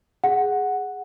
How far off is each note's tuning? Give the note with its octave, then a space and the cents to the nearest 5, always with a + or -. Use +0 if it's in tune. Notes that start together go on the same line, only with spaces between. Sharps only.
G#4 +0 F#5 +0